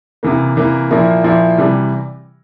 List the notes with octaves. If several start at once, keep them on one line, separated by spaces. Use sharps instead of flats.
C3 E3 A#3
C3 E3 A#3
A#2 F3 A#3 E4
A#2 F3 A#3 E4
C3 E3 G3